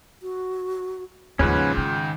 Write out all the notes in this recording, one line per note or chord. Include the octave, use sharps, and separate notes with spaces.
F#4
D#2 G#2 C#3 F3 C#4 F4 B4 F#5
D#3 G5